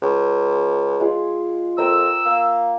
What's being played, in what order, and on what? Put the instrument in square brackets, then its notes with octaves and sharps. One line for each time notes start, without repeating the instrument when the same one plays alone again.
[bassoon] C#2
[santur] G#3 F4 G#4
[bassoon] F2 [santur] A#4 E5 G5 [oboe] E6
[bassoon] A#3